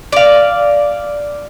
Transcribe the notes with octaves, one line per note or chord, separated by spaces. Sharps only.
D5 F5